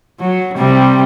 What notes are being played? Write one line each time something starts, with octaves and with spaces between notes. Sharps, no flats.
F#3
C3 G3 C4